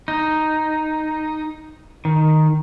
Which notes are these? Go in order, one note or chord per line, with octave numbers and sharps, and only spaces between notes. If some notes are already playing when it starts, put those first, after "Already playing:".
D#4
D#3